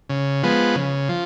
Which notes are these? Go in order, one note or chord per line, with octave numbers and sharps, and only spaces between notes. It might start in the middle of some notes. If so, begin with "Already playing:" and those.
C#3
F3 G#3 B3
C#3
F3